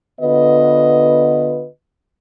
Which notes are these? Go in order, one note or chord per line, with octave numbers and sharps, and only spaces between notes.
D3 B3 F4 B4 D#5